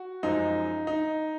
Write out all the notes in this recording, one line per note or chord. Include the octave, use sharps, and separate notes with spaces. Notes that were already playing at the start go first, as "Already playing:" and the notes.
Already playing: F#4
F#2 F3 G#3 D#4
D#4